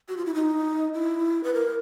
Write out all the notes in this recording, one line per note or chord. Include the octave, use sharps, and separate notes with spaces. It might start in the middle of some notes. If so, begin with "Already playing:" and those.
F#4
F4
E4
D#4
E4
B4
A#4